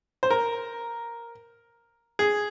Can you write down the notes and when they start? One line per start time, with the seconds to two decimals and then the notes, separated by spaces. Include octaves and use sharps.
0.23 C5
0.31 A#4
2.19 G#4